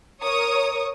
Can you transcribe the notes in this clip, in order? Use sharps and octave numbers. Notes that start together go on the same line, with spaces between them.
A#4 C#5 C#6 D#6